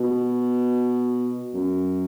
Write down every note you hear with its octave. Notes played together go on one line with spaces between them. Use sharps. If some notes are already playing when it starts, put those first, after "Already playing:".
Already playing: B2
F#2